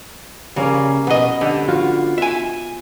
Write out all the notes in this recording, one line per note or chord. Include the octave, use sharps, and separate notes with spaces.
C#3 G3 A#3 C#4
B2 B3 D#5
D3 G4 A4
F4 F#4
E5 G#5